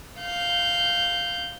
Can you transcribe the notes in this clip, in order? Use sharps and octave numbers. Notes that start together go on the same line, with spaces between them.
F5 G6